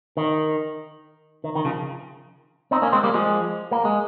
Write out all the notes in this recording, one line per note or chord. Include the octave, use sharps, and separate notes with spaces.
D#3
D#3
D#3
C#3 F3
C4 D#4
A#3 C#4
G#3 C4
G3 A#3
F3 G#3
A#3
G#3